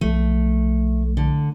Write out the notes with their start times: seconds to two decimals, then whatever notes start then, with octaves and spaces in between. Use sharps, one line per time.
0.01 B1 F3 A3
1.17 D3